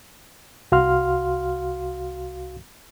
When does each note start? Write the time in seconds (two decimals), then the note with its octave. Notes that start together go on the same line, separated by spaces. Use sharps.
0.72 C2 F#4 F5 C6 F6